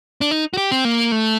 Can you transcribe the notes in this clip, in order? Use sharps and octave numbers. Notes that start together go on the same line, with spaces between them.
D4
D#4
F#4
G4
C4
A#3
A3